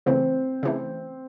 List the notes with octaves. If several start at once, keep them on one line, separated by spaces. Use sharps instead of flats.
C#3 E3 A3 C4
C#3 E3 A3